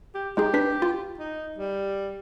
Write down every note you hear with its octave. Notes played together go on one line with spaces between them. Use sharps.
G4
G#3 D#4 G4 G#4
D4 B4 B6
F4
D#4
G3